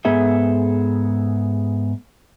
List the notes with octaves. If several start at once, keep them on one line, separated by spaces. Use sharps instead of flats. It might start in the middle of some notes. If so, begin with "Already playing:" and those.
G#2 B3 G#4 A4 E5